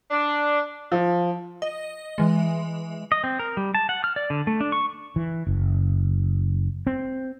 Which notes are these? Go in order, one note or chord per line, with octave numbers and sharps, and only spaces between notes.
D4
F3
D#5
E3 G#3
D#5
C4
A#4
G3
A5
F#5
F6
D5
D3
A3
D4
C#6
E3
F#1
C4